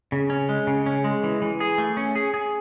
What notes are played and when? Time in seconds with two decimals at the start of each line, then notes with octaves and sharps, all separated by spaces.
0.12 C#3
0.30 C#4
0.49 G#3
0.67 C#3
0.86 C#4
1.04 G#3
1.23 E3
1.42 E3
1.60 G#4
1.78 A3
1.97 C#4
2.16 G#4
2.34 G#4